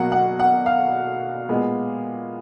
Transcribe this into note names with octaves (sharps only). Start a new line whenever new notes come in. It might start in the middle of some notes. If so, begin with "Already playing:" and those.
Already playing: B2 F#3 A#3 F#5
F#5
F#5
F5
A#2 G#3 B3